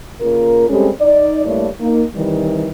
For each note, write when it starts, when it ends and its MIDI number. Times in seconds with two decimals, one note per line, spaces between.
0.20 0.68 49
0.20 0.68 58
0.20 0.68 65
0.20 0.68 70
0.69 0.89 55
0.69 0.89 56
0.69 0.89 60
0.69 0.89 61
0.69 0.89 67
0.69 0.89 69
1.01 1.43 63
1.01 1.43 74
1.45 1.67 43
1.45 1.67 57
1.45 1.67 58
1.45 1.67 64
1.45 1.67 73
1.45 1.67 74
1.80 2.03 58
1.80 2.03 63
2.14 2.69 48
2.14 2.69 51
2.14 2.69 52
2.14 2.69 55